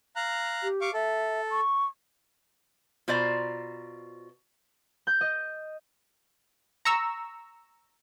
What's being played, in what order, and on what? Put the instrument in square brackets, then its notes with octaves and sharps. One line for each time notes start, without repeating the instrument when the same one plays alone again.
[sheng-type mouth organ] F5 A#5 F#6
[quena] G4
[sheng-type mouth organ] F5 C#6 D6
[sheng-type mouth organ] A4 [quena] E5
[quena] C#6
[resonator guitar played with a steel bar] B2 F4 C5 D5 A#5
[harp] G6
D#5
[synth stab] A#5 C#6 E6